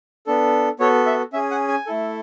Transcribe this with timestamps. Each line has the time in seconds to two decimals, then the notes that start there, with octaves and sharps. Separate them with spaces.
0.26 B3 D4 A4
0.79 B3 F#4 A4 C#5
1.06 E5
1.33 C#4 G#4 E5
1.51 F#5
1.68 G#5
1.87 A3 E4 A4